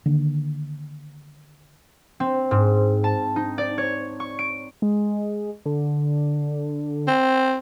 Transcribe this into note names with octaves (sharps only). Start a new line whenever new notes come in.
D3 D#3 A#3
C4
G#2
A5
D#4
D5
C#5
C#6
D7
G#3
D3
C4